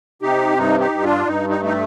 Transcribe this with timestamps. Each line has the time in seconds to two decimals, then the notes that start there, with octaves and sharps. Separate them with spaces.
0.22 C3 D#4 G4
0.57 G2 D#4
0.80 D#4 G4
0.92 G2
1.04 D4 F4
1.27 G2 D#4
1.50 D#4
1.61 A3 D#4